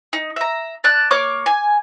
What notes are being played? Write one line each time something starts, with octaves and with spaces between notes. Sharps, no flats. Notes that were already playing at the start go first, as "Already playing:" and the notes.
D#4
E5 A#5
D5 A5 F#6
A#3 C#5 D6 F6
G#5